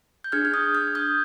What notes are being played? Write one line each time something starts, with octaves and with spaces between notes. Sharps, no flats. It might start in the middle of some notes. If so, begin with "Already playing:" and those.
G6
D4 G#4 F6 G#6
F6
D#6 G6
F6 G#6
D#6 G6